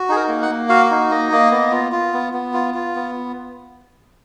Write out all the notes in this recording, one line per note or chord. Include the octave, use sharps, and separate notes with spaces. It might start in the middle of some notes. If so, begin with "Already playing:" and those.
Already playing: F#4
D#4 G#4
A#4
A#3
F#5
A#3
F#4 F5
D#4
A#3 D#5
A#3
B3
F4
F4
B3
B3
F4
F4
B3